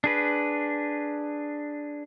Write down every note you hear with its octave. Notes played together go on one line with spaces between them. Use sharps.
D4 G#4 B4